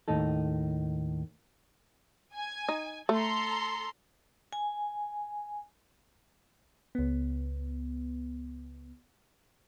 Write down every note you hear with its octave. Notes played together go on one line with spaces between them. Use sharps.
D#2 A2 D#4 A4
G#5
D#4
A3 A4 A#5 C6
G#5
C#2 B3